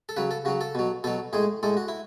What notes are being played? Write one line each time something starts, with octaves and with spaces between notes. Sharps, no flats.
A4
C#3 F#3 B4
A4
C#3 F#3 F#4
A4
B2 F#3
B2 F#3 A4
A2 G#3 G#4
A2 G#3 A4
F#4
E4